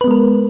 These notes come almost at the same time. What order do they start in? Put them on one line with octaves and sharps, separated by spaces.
B4 B3 G#3 A#4